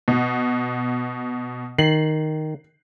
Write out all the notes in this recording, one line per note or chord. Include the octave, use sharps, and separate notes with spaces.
B2
D#3 C7 F#7